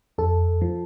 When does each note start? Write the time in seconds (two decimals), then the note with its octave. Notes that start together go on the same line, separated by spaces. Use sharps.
0.18 F2 A4
0.61 F3